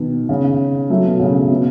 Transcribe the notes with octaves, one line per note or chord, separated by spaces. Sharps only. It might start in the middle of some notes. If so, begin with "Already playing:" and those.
Already playing: B2 D#3
C#3
F#3 A3
B2
C#3
B2